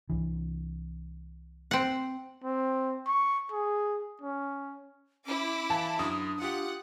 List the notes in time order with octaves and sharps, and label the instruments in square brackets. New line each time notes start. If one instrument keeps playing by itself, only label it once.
[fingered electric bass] C2 C3 E3
[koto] C4 F#5
[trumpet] C4
C#6
G#4
C#4
[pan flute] C#4 [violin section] E4 D6
[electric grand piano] E3 [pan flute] F5 [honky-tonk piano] A5
[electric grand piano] F#2 [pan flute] D4 [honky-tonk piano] D#6
[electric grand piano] F4 G4 [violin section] F#5